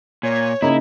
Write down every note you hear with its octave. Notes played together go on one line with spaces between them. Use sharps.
A#2 C#5 G#5
C#3 A#3 D#4 E4